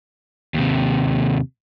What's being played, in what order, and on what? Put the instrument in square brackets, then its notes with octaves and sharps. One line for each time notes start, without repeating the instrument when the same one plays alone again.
[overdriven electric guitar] D#2 C3